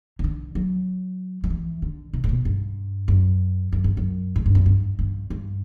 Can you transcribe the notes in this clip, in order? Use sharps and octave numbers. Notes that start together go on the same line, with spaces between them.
C3
D3
F#3
F#3
E3
D3
C3
A2
B2
G2
F#2
F#2
G2
F#2
A2
G2
F#2
G2
G2
G2